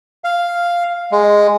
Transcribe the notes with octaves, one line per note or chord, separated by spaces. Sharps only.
F5
G#3